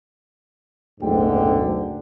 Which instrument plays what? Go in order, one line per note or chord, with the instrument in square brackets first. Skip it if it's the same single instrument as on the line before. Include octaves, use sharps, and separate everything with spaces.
[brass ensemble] F#1 D2 G#2 B2 D3 G5